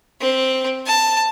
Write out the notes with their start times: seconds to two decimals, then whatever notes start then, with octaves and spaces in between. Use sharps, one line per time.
0.21 C4
0.86 A5